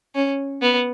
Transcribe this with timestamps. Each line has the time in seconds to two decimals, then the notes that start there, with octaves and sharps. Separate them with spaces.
0.15 C#4
0.62 B3